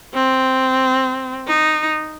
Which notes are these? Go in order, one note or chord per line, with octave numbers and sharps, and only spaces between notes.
C4
D#4